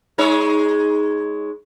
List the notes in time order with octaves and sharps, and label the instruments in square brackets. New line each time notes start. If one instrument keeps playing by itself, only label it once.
[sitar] G#3 D#4 C#5